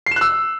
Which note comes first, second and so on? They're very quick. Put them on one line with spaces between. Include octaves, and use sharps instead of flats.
C7 E7 F#6 E6